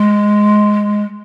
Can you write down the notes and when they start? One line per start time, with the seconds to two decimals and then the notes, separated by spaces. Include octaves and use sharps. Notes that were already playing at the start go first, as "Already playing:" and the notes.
Already playing: G#3